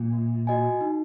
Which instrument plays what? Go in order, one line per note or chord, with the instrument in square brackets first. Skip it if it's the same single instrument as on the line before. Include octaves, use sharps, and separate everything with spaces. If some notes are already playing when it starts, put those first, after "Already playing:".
Already playing: [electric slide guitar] A#2
[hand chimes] A#3
F#4 D#5 G#5
D#4